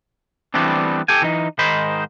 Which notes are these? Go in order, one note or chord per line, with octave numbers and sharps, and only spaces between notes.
E3 G3 A3 B3 C4 D4
G4 A4 G5 G#5
E3 D#4
G#2 D#3 D#4 C5 B5